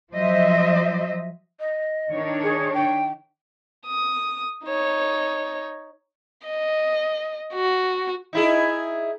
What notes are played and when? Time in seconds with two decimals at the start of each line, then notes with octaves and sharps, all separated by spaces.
0.12 F3 F#3 C5 D#5 E5
1.60 D#5
2.10 D#3 D4 C#5
2.43 G#4
2.74 G5
3.87 D#6
4.65 D#4 C#5
6.46 D#5
7.53 F#4
8.33 D#4 E4 G#4